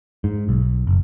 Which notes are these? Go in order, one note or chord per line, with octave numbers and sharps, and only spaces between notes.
G#2
B1
F#1